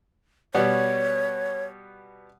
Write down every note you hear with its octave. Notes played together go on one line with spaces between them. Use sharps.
B2 G3 B3 C#5